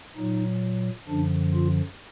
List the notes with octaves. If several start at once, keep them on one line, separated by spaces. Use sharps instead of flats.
A#2 F#3 D#4
F#2 D3 F3 D4
F4